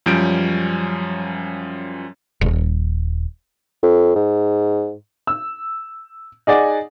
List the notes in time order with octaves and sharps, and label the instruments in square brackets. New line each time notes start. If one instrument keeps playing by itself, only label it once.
[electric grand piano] F#2 F3 G3 C#4 G6 D7
[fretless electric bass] D#1
[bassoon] F2
G#2
[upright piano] E6
D#4 G#4 D5 F#5